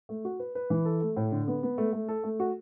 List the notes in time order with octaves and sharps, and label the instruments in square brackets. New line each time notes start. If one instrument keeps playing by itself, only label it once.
[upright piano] A3
F#4
B4
B4
E3
A4
A3
A2
D3
B3
B3
A3
A3
A4
A3
F#4